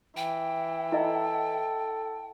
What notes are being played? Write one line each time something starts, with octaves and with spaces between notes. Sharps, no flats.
E3 G5
E4 A4 D#5